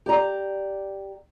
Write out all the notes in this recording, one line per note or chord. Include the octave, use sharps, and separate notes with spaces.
G4 D5 A#5